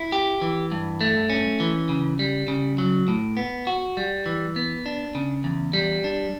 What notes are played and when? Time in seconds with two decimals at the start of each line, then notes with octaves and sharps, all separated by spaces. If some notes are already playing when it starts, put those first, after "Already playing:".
Already playing: E4
0.12 G4
0.41 E3
0.72 G2
1.01 A3
1.30 C#4
1.60 E3
1.89 C#3
2.19 G3
2.48 C#3
2.78 F#3
3.08 A2
3.37 B3
3.67 F#4
3.97 G3
4.26 E3
4.56 B3
4.86 D4
5.15 C#3
5.44 E2
5.73 G3
6.04 D4